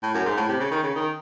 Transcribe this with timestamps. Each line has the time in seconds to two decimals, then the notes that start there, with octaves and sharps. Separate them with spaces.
0.03 A2
0.14 F#2
0.25 G#2
0.37 A2
0.49 C3
0.60 C#3
0.71 D#3
0.83 C#3
0.96 D#3